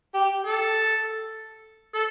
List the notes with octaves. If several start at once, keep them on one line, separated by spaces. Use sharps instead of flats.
G4
A4
A4